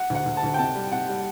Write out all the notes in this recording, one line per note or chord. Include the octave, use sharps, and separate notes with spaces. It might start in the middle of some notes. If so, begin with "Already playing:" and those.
Already playing: F#5
D2 F#5
D2
A5
D2
G5
C3 A5
G3
C3 F#5
G3